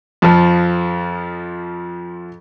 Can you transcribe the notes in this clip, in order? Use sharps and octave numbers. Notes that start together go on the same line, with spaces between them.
F2 F3